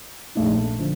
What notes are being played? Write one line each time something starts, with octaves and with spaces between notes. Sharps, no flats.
A#1 A#2 A3 D#4
D3 F3